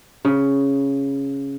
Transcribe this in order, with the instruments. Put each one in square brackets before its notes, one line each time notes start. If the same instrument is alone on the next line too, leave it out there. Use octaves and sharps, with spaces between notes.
[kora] C#3